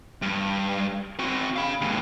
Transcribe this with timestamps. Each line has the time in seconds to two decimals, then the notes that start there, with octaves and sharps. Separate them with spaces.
0.22 G2
1.19 C4 F#4
1.56 F5 B5
1.81 D#2 G#2